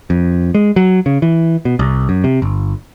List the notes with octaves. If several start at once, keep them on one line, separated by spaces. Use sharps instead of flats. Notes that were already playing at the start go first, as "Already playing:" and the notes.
F2
G#3
F#3
C#3
E3
B2
C2
F#2
C3
G1